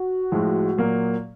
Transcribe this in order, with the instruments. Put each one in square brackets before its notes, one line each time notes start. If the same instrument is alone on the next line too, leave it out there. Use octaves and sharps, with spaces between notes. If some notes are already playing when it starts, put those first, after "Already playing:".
Already playing: [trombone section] F#4
[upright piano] A2 F3 G#3
A#2 F#3 A#3